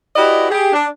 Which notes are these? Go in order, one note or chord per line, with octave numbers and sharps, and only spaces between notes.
E4 F#4 G4 B4 D5 D#5
G4 G#4
D4